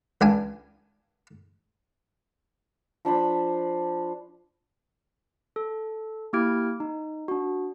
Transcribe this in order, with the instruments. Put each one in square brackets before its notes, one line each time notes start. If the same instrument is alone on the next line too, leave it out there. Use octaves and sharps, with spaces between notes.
[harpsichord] C#2 D4 G#5
[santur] F3 D4 C5 B5
[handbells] A4
A#3 E4 G4 F6 G#6 D7
D#4
D4 F#4